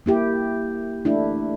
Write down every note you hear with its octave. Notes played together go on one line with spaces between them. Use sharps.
A#3 E4 G4
A3 D4 E4